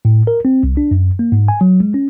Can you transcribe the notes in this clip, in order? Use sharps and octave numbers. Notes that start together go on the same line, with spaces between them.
A2
A#4
C4
C2
D4
F#2
A#3
G#2
G#5
F#3
G#3
C#4